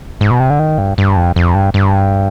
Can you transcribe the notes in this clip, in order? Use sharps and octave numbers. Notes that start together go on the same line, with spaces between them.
G#2
B2
C3
D3
D#3
G2
G2
F2
F2
G2
G2